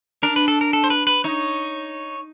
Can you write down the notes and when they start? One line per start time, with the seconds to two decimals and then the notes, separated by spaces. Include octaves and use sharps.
0.23 D4 A#4
0.36 B4
0.48 A4
0.61 A#4
0.73 A4
0.84 C5
0.90 B4
1.07 B4
1.24 D#4 C#5